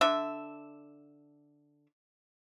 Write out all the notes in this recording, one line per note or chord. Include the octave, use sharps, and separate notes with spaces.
D3 D4 E5